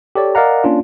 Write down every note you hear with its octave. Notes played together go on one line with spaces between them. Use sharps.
G4 A4 C#5 D5
A#4 D5 D#5 F5 F#5 A#5
A#3 C#4 D4 F4